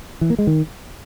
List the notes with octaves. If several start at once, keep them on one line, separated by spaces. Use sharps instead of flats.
E3
A#3
G#3
D#3